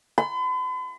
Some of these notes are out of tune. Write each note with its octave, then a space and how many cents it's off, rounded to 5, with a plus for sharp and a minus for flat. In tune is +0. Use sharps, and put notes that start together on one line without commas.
B5 +45